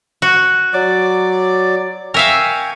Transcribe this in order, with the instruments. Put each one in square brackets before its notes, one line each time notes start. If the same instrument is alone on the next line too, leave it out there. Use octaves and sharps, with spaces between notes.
[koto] F#4
[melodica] F#3 D5 D6
[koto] A#4 E5 F5 [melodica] G5 G#5 C#6